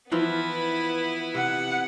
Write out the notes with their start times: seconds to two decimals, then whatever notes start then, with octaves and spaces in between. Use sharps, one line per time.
0.12 E3 F3 B3 E4 F4 B4
1.34 C3 F#5